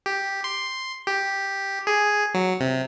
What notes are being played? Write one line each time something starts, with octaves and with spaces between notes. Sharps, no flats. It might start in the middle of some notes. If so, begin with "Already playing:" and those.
G4
C6
G4
G#4
F#3
C3